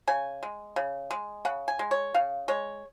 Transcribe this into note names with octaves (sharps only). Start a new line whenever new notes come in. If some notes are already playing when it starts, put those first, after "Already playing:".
C#3 G#5
G#3
C#3
G#3
C#3 F#5
G#5
G#3
C#5
C#3 F5
G#3 C#5